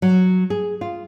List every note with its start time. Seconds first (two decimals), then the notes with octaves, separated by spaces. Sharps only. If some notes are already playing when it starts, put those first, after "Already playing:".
0.02 F#3
0.50 G#4
0.81 F4